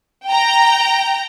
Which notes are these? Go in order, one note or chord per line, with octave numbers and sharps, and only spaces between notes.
G5 A#5